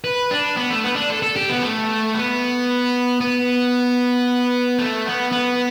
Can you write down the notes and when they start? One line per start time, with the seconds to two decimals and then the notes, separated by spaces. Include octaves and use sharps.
0.04 B4
0.31 D4
0.57 B3
0.70 A3
0.84 B3
0.96 D4
1.10 A4
1.22 A4
1.36 G4
1.49 B3
1.62 A3
2.14 B3
3.21 B3
4.79 A3
5.06 B3
5.32 B3